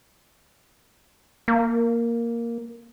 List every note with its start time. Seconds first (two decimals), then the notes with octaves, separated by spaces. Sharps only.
1.48 A#3